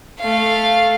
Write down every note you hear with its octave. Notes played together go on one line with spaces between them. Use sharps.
A3 F5